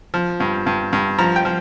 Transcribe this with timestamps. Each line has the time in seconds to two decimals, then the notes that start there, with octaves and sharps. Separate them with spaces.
0.14 F3
0.40 G2
0.66 G2
0.93 G2
1.18 F3 A#5
1.36 G5
1.45 F3